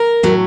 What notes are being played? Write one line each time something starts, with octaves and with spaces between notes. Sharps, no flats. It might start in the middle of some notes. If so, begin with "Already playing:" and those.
Already playing: A#4
A2 F#3 A3